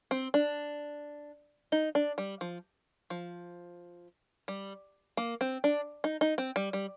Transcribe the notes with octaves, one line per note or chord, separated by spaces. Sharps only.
C4
D4
D#4
D4
G3
F3
F3
G3
A#3
C4
D4
D#4
D#4
C4
G3
G3